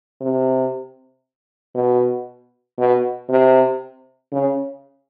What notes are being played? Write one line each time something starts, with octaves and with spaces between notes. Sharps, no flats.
C3
B2
B2
C3
C#3